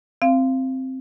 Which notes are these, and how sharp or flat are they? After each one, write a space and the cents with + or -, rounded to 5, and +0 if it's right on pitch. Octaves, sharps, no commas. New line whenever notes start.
C4 +0 F5 -20